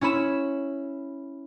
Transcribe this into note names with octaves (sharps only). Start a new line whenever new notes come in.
C#4 E4 C#5 B5 E7